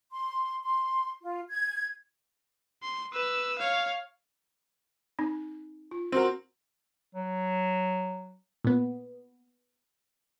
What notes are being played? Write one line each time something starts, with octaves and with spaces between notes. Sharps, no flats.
C6
C6
F4
G#6
C6
B4 E6
C#5 F5
C4 D#4
F4
C4 F#4 A#4
F#3
A#2 B3